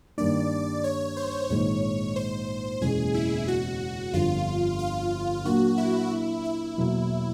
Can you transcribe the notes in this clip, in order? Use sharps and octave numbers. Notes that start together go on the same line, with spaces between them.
G2 D#3 G3 A#3 D4 D5
C#5
C5
A#1 G#2 D#3 G#3 C#5
C5
F#1 E2 B2 G#3 C#4 G#4
E4
F#4
G1 F2 D3 G3 F4
F4
A#2 F#3 A#3 D4 F#4
E4
E4
E2 B2 F#3 A#3